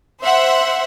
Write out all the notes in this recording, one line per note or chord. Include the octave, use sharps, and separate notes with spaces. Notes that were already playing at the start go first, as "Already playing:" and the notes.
C5 E5 F#5